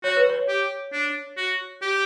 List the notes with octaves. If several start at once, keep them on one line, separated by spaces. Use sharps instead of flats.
F#4 C#5
B4
C#5
G4
D4
F#4
G4